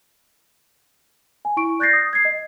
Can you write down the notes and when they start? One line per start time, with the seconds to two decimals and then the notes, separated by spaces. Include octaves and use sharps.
1.45 G#5
1.57 E4 C#6 D7
1.79 D5 F#6 G6 A6 A#6 C7
1.93 D#6
2.13 G#6 C7
2.25 D#5